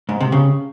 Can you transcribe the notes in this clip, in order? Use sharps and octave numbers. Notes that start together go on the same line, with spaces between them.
G#2
C3
C#3